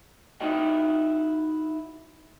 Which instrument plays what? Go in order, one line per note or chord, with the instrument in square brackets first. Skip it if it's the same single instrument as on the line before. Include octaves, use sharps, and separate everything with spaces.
[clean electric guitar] D#4 E4 F#4 D#5 G5